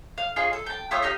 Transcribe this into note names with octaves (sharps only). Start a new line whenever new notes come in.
F5
F4 G#4 C#5 D#5
A4
G5 A5
A3 F4 C#5 D#6
D#4 G4 D#5 F5